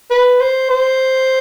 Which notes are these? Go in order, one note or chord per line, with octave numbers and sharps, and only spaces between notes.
B4
C5
C5